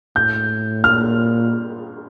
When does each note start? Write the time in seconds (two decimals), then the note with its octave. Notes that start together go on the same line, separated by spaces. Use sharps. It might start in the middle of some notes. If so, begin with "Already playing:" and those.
0.16 A2 G6
0.84 A#2 F6